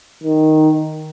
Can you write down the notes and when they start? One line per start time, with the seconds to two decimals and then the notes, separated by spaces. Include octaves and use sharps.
0.23 D#3